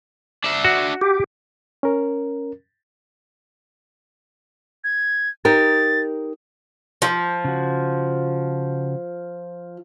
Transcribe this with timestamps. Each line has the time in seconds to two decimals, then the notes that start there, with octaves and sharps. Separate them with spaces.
0.44 D4 E5
0.65 F#4
1.01 G4
1.83 C#4 A#4
4.84 G#6
5.45 D#4 G4 A#4 A6
7.02 F3
7.45 C#3 F#4